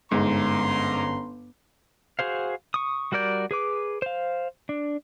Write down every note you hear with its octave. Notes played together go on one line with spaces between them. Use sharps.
G1 G#2 G#3 C#4 A#5 C6
F#4 G#4 C5 F5
C#6 D#6
G3 F#4 A#4 D5 G6
G#4 B4 D6
C5 F5
D4